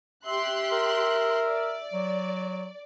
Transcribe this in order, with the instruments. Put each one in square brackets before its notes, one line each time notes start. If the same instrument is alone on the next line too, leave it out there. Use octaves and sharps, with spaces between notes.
[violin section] G4 C6 F#6 [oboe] E5
[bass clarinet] A#4
[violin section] D5
[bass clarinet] F#3